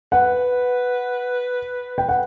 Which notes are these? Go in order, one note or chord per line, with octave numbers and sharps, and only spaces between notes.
B4 F#5
G5
F#5